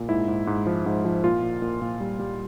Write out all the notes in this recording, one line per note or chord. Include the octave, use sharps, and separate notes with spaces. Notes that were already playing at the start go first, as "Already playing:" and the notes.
Already playing: A#2
G#2 E4
G#2
G#2
F3
G#2
F3
A#2 F4
A#2
A#2
A#2
G3
G3